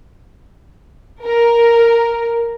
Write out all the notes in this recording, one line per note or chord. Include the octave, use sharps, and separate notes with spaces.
A#4